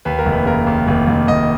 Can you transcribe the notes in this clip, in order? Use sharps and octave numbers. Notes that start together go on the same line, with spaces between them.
D#2 B4
A#4
F1
B4
C#3 A#4
D#2
F1
F1
F1 D#5